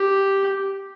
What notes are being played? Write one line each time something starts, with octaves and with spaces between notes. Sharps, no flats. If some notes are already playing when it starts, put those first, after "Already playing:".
Already playing: G4